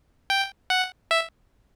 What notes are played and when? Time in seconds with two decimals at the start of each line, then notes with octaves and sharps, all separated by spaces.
0.30 G5
0.70 F#5
1.11 E5